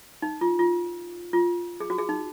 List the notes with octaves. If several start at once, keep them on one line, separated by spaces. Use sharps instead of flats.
D#4
F4
F4
F4
G#4
F#4
G#4
D#4